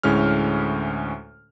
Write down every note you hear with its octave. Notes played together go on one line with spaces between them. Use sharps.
D2 A2 G#3 C#4 F6